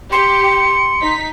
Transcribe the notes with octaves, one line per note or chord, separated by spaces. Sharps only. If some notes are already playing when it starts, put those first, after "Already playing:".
G4 C6 C#7
D#4 B6